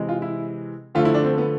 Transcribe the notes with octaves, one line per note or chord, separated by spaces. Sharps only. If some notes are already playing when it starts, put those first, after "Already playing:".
Already playing: C3 E3 G#3
F4
E4
D3 F3 A3 F4
E4
D4
C4
B3